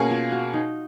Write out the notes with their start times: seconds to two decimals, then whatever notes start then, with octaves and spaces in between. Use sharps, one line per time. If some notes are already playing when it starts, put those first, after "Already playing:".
Already playing: B2 A#3 C#4 G#4
0.10 F4
0.32 F#4
0.53 D#4